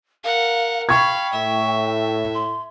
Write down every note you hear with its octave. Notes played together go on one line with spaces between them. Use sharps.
A#4 F5 F#5
F5 G5 B5 C#6 G#6
A2 E5
C6